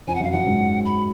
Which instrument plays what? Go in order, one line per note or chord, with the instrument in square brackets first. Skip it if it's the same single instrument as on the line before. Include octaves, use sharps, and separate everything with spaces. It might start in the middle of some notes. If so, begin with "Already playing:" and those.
[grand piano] F2 [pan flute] G#5
[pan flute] F#5
[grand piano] F#2
[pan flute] F5
[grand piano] F#2 [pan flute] F#5
[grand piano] G#2
[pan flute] B5